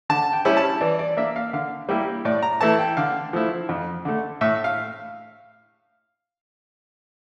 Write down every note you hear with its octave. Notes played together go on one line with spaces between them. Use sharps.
D3 A5
G5
G3 C#4 E4
A5
E3 D5
D5
A#3 D4 E5
F5
D3 F5
G3 A#3 E4 G5
A2 D5
A#5
E3 A3 E4 A5
G5
D3 F5
F3 A3 E4
F2
D3 A3
A2 E5
F5